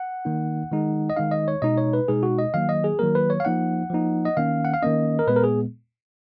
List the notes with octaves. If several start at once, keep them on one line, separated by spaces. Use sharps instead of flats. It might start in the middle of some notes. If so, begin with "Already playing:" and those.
Already playing: F#5
D#3 A#3 D#4
D#3 G#3 D#4
D#5
D#3 G#3 D#4 F5
D#5
C#5
B2 G#3 D#4 D#5
C#5
B4
B2 G#3 D#4 G#4
F#4
D#5
D#3 F#3 A#3 F5
D#5
G#4
D#3 F#3 A#3 A#4
B4
C#5
F5
F3 A#3 D#4 F#5
F3 A#3 D#4
D#5
D#3 A#3 C#4 F5
F#5
F5
D#3 A#3 C#4 D#5
A#4
A#2 G#3 B3 B4
A#4
G#4